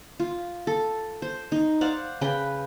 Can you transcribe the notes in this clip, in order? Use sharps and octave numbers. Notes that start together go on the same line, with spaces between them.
F4
A4
C5
D#4
C5 D5 F5 F#5
C#3 B4 G5